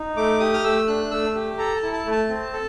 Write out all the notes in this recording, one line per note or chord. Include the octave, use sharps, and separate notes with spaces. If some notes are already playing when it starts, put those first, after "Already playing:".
Already playing: D#4
A3 D6
G4 D#6
F6
A3 E6
D4 F#6
A3 E6
G4
A4 A#5
A5
E4
A5
A3
A5
C4
A4